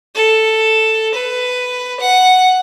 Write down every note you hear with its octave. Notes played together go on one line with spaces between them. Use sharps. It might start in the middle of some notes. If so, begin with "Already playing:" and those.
A4
B4
F#5